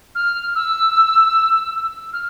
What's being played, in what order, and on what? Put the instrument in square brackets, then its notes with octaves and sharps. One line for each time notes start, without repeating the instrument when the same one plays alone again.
[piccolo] F6
E6
F6